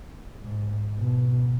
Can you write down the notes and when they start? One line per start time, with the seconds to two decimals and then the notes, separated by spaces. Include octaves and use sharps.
0.42 G#2
0.99 B2